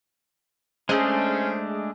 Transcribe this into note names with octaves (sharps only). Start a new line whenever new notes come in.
G#3 A3 C#4 D4 G#4 C5 D#5